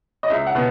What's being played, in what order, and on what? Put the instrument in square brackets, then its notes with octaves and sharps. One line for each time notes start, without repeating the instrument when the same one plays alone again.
[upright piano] D#5
C#2 E5
F#5
B2 B3